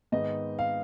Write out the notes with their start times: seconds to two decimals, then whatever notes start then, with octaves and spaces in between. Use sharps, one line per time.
0.12 G#2 D#3 G#3 B3 D#5
0.59 F5